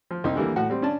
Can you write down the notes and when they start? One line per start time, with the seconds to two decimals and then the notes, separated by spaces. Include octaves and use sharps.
0.11 F3
0.24 C2 C4 D#4 D#6
0.36 D3 E3 G3 A#3
0.56 A2 F#4 F#5
0.70 G3 C4
0.82 C#4 D4 A5